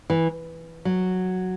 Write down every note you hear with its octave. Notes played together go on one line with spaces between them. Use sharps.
E3
F#3